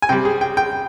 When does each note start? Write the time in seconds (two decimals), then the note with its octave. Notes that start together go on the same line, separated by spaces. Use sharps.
0.02 G#5
0.09 C3 G3 G5
0.25 G#4
0.41 G5
0.57 G5